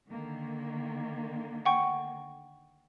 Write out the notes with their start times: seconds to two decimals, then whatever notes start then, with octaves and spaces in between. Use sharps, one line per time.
0.11 D3 D#3 A#3
1.65 F#5 G5 C#6